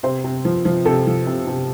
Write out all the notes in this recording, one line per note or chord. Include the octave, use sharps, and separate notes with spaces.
C3 C5
C3
F3
F3
C3 A4
F3
C3
C3